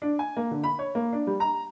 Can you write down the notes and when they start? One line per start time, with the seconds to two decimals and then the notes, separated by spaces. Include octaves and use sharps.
0.02 D4
0.19 G#5
0.37 A#3
0.51 D3
0.64 B5
0.79 C#5
0.95 A#3
1.13 D4
1.27 G3
1.40 A#5